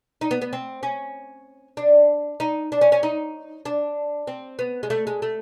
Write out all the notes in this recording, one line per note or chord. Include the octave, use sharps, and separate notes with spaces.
D#4
B3
B3
C4
C#4
D4
D#4
D4
C#4
C#4
D#4
D4
C4
B3
G#3
A3
G#3
A3